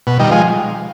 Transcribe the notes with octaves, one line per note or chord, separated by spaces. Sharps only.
B2
D#3 G3
F3 G#3